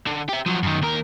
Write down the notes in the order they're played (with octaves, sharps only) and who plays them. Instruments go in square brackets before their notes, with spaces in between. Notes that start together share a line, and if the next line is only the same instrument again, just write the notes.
[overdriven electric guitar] D3
G4 E5
F3 F#3
F#2 D#3
D#2 A#4